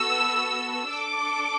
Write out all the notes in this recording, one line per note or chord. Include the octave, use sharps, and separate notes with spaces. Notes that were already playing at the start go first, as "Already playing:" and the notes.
Already playing: B3 F#4 A4 E6
D4 A4 D6